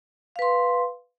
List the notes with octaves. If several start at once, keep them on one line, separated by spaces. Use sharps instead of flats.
B4 F5 C6